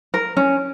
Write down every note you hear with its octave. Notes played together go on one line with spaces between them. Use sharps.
A#4
C#4